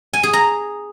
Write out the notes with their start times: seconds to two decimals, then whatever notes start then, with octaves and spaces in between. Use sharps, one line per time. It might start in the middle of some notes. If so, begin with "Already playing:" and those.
0.13 G#5
0.23 G#4
0.33 A#5